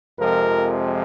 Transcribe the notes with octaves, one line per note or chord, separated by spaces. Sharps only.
F2 C3 F3 G#3 A#4